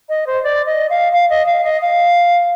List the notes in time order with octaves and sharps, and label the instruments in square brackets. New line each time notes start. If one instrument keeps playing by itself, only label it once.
[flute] D#5
C5
D5
D#5
F5
F5
D#5
F5
D#5
F5